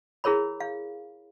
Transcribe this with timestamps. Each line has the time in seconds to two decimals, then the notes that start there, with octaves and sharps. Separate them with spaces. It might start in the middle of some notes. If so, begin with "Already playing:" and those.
0.24 E4 G#4 A#4 C#5 B5
0.60 F5